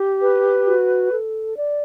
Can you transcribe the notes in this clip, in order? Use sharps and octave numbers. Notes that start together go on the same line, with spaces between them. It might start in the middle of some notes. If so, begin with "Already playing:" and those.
Already playing: G4
B4
F#4
A4
D5